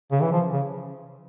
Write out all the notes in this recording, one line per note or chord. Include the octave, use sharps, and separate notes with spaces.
C#3
E3
F3
C#3